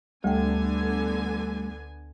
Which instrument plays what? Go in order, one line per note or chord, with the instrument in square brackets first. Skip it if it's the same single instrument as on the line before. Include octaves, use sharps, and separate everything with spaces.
[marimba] D2 G5 [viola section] D3 B3 G#5 [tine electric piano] G3 A3